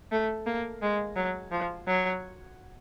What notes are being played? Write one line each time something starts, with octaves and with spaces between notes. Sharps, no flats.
A3
A#3
G#3
F#3
F3
F#3